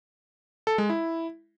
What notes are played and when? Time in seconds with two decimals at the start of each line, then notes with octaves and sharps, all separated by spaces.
0.67 A4
0.78 G#3
0.90 E4